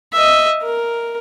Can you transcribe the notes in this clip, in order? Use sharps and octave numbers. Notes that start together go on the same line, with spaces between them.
D#5 E5
A#4